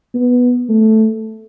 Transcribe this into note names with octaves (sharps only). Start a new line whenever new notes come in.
B3
A3